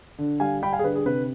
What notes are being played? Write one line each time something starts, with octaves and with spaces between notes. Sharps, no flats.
D3
G3 F5 G#5
G3 G5 B5
F5 G#5
G#4
D3 B4
G#4
C3 B4